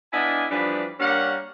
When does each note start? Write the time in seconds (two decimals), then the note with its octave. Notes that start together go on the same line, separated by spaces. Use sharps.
0.12 B3 D4 E4 D#5 F5 G#5
0.51 E3 F3 G3 D4 D#4 B4
0.99 G3 A#3 C#4 D4 A#4 F#5